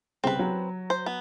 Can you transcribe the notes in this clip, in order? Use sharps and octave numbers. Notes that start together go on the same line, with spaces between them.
C2 C#3 C4 B4
F#3
C5
B3